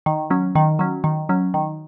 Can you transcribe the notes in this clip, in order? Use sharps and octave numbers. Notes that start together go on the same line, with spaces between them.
D#3
F#3 C#4
D#3
F#3 C#4
D#3
F#3 C#4
D#3